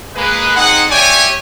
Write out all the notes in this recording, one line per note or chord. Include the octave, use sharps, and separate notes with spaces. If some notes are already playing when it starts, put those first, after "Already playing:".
G#3 A#3 B4
C4 D#4 G#4 F#5
G4 C#5 D5 E5 G5 G#5